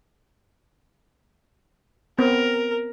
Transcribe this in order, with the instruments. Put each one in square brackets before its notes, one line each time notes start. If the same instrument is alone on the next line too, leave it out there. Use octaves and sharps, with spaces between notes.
[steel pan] B3 C4 [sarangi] A#4